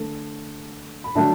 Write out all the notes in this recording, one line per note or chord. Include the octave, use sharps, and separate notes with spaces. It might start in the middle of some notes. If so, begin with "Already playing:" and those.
Already playing: D3 A3
B5
D3 F#3 A3 D4 E5 A5